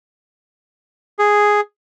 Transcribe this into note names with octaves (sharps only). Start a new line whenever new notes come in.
G#4